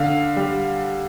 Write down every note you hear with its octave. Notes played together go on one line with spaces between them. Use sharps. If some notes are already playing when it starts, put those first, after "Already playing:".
Already playing: D3 F5
G3